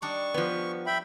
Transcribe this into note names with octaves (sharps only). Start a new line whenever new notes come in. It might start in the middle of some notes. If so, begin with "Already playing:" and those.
G3 D4 D#4 C#6
F3 B3
E5 G5 B5